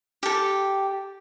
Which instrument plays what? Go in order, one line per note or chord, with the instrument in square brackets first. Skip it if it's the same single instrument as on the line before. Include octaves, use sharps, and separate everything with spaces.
[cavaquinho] G4 A4